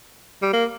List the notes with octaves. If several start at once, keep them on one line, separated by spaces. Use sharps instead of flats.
G3
A#3